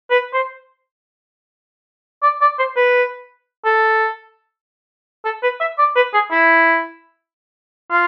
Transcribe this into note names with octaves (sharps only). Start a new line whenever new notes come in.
B4
C5
D5
D5
C5
B4
A4
A4
B4
E5
D5
B4
G#4
E4
F4